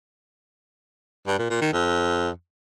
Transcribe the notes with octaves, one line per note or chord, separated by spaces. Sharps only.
G2
A#2
A#2
D#3
F2